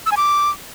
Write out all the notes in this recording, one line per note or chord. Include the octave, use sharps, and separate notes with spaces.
E6
G#5
D6